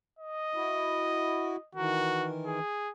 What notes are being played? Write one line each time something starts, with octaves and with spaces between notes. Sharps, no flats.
D#5
E4 F#4
D#3 E3 F#4 A#4
G#4